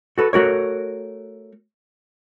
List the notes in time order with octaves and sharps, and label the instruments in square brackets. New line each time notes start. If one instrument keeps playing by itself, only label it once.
[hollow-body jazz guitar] F#4 A4 B4
A3 F#4 A#4 C#5